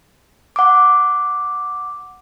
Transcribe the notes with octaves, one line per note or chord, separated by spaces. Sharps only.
F#5 D6